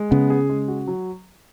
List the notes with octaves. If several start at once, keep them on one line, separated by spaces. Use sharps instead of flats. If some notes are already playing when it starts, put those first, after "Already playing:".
Already playing: G#3
C#3 B3
G#4
G#3
F#4
F#3